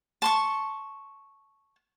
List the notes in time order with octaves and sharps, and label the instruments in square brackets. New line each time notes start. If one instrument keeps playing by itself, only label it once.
[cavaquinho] A5 C6 C#6